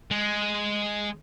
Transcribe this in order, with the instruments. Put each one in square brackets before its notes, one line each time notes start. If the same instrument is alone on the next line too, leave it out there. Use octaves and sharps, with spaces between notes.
[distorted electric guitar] G#3